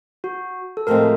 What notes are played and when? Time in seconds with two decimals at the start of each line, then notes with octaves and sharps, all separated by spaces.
0.24 F#4
0.77 A4
0.87 A2 F3 G#3 C4 A#4